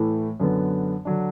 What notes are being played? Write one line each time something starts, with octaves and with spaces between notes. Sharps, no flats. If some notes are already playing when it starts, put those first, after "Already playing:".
Already playing: A2 E3 A3
F#2 D3 B3
D3 F#3 D4